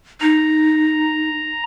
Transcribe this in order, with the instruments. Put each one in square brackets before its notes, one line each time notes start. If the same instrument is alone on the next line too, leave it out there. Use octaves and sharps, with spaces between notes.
[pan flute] D#4 [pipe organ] A#5